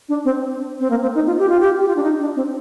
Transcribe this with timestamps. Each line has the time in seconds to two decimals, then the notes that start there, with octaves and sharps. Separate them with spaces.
0.09 D4
0.25 C4
0.80 C4
0.90 A#3
1.02 C4
1.15 D#4
1.27 F4
1.39 G4
1.49 F4
1.60 G4
1.79 G4
1.88 F4
1.96 D4
2.03 D#4
2.20 D4
2.36 C4